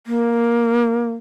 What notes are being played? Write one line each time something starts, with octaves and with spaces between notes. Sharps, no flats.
A#3